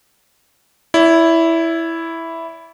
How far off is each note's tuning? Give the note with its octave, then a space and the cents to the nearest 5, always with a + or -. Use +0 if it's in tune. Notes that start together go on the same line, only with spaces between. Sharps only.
E4 +0 D5 -45